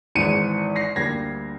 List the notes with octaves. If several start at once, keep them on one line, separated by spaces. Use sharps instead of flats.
G#1 G#2 E3 C#7 D#7
A#6 C7
D2 D3 G3 A#3 G#6 A#6